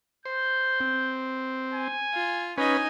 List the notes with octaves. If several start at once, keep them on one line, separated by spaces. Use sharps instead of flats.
C5 G6
C4
G#5
F4
C#4 D#4 B4 D#5 G#5